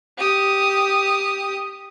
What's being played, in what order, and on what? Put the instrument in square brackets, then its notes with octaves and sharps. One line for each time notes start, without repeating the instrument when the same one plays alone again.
[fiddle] G4 D#6